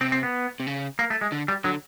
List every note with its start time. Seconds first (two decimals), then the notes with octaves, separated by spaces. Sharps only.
0.01 C3 C4
0.12 C4
0.23 B3
0.60 C3
0.67 C#3
0.99 A#3
1.10 A3
1.21 G#3
1.32 D3
1.48 G3
1.64 D3 F#3